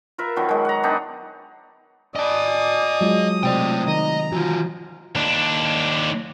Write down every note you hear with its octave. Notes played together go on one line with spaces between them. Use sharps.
F4 A#4 B4 E5
D#3 F3 F#3 B3
F#3 G#3
F#5 A#5
B3 D4 D#4 G4
D5 D#5 G#5 A5 D#6
F#3 G#3 F4
C3 A3 C5 D5 G5
D#3 D#5 A#5
E3 F4 F#4
D#2 D4